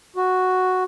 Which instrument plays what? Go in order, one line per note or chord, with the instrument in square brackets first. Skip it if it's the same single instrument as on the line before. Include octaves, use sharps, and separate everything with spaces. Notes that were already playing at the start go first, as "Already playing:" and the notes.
[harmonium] F#4